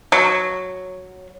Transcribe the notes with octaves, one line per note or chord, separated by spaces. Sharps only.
F#3